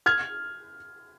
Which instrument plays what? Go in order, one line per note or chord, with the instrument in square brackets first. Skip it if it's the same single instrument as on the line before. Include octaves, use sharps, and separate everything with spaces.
[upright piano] F6 G#6